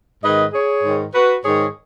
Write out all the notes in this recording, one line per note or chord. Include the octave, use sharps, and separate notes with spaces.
G#2 D#3 B4 D#5
G#4 C#5
G#2 D#3
F#4 B4
G#2 D#3 G#4 C#5